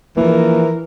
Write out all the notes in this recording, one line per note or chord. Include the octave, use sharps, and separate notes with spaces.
E3 F3 A#3 A#4